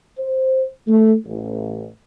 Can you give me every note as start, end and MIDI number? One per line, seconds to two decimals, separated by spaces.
0.18 0.66 72
0.87 1.14 57
1.26 1.86 33